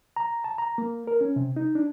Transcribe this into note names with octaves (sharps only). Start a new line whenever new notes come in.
A#5
A5
A#5
A#3
A#4
C#4
C3
D#4
D4